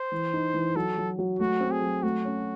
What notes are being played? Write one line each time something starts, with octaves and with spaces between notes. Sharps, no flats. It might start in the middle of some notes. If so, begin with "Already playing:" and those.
Already playing: C5
E3
D#4
E3
F#3 A4
F#3
F#3
A3 F#4
C4
G#4
F#3
A3 F#4
C#4